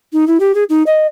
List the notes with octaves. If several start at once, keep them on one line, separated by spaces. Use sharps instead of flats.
D#4
E4
G4
G#4
D#4
D#5